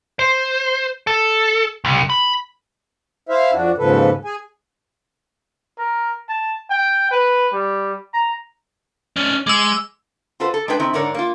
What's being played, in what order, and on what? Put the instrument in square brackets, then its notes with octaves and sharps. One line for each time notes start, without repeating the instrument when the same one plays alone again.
[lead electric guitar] C5
A4
C2
B5
[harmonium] E4 C5 E5 F5
F2 D4 F#4
D#2 G#2 C#3 F3 A4 B4
G#4 G#5
[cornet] A#4
A5
G5
B4
G3
A#5
[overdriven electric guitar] C#4 D4
[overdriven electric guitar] G#3 [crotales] D6 E6
[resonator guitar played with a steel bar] F4 F#4 A4 B4 C5
A4
G#3 D4 B4 G5
D#3 C4 E4
G#2 D3 D4 A#4 C#5
A#3 F4